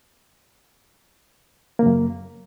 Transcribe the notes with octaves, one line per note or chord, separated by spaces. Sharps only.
F#2 C#3 A#3